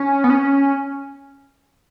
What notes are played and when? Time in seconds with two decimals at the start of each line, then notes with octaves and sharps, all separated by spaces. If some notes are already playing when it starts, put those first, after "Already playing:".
Already playing: C#4
0.24 B3
0.30 C#4